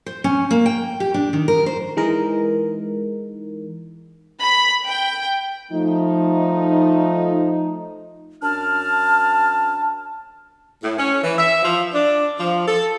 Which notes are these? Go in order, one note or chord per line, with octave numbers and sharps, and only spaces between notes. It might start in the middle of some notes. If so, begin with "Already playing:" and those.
C5
C#4
A#3
G5
G4
D4
D#3
A#4
C5
E3 G#3 D#4 A#4
B5
G5
F3 A3 D#4
F#2 D4 A5 F6
A2
C#4
E3
E5
F3
D4
F3
A4